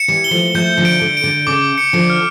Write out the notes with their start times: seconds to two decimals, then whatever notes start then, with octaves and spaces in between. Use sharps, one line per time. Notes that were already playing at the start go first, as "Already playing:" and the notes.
Already playing: C#7 E7
0.08 E3 G3
0.24 G7
0.31 F3 A3
0.54 F3 A3 G6
0.77 D3 F3
0.85 D7
1.01 D3
1.17 D7
1.24 D3
1.47 C#3 D6
1.78 C#7
1.93 D3 F3
2.10 F6